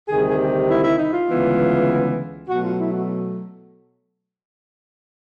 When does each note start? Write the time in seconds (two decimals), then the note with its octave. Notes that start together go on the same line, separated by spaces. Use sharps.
0.08 D2 C3 D#3 G3 G#4
0.29 G#4
0.39 G4
0.69 E4
0.84 E4
0.98 D#4
1.13 F4
1.29 D2 C#3 E3 G#3 B3
2.49 B2 F#3 A3 F#4
2.63 F4
2.79 E4
2.93 F#4